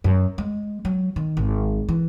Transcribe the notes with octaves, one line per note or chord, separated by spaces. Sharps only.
F#2
G#3
F#3
D#3
G#1
E3